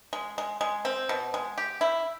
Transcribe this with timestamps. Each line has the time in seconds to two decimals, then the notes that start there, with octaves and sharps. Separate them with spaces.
0.13 G#3
0.38 G#3
0.61 G#3
0.85 C4
1.09 B2
1.34 G#3
1.58 G4
1.81 E4